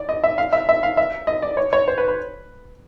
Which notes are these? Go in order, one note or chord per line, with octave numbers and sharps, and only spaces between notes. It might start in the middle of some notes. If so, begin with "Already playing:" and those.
Already playing: D5
D#5
E5
F5
E5
E5
F5
E5
D#5
D5
C#5
C#5
C5
B4
B4